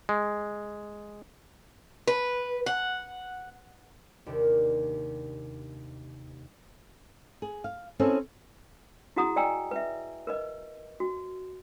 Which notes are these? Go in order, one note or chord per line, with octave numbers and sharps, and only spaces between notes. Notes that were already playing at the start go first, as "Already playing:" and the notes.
G#3
B4
F#5
D#2 C3 D4
G#4
F5
C4 C#4 E4 G#4 A4 B4
E4 F#4 G#4 F#5 A#5 D#6
D5 D#5 G5 G#5 A#5 E6
B4 E5
A#4 B4 D#5
F#4